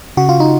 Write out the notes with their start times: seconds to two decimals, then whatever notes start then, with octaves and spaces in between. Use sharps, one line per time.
0.17 C#3 F#4
0.29 F4
0.40 D#4